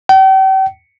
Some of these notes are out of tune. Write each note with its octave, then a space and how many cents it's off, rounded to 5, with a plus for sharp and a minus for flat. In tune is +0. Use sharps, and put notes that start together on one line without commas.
G5 -40